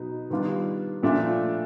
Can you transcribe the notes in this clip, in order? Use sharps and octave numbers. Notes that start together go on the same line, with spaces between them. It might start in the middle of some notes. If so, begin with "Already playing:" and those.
Already playing: B2 F#3 B3 D#4
D#3 G3 B3 D4 F4
A#2 F3 A3 D4 F4